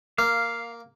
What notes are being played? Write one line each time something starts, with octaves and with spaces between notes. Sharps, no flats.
A#3 F5